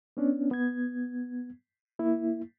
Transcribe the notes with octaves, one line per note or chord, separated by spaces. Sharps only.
B3 C#4 D4
B3 G#6
A#3 E4